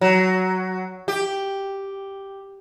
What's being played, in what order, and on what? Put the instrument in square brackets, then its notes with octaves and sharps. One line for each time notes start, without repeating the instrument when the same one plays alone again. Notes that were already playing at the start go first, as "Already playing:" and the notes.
[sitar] F#3
G4